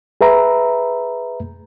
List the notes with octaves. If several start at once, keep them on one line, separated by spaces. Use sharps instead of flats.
G#4 B4 E5 A#5 B5